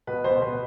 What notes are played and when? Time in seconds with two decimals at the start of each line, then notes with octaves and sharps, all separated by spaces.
0.07 B2 B4
0.24 B2 C5
0.42 B2 B4